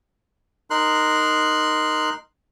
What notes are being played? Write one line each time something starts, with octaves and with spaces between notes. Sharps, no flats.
D#4 A#4 C6 F#6